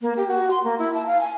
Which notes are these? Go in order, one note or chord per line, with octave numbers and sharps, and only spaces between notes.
A#3
G4
F#4
C6
A#3
E4
A5
F5
G#5